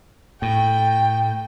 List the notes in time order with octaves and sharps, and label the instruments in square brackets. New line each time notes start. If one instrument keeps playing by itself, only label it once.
[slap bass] A2 [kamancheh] G5